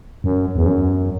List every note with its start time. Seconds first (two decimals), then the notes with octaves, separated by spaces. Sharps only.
0.24 F#2
0.55 E2
0.66 F#2